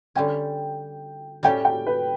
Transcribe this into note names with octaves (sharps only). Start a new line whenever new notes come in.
D3 G3 C#4 G5
A2 G3 C#4 G4 G5
G5
B4